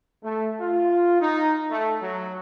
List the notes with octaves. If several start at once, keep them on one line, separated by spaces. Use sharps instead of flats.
A3
F4
D#4
A3
F#3